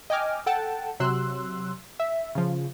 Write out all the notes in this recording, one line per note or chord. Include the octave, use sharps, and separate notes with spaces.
D#5 G5 G#5 D6 F6
A4 F#5 G5 A5
C3 F#3 C6 E6 F#6
E5
C#3 F3